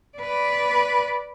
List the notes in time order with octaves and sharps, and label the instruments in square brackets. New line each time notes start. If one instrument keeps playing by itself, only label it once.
[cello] B4 D5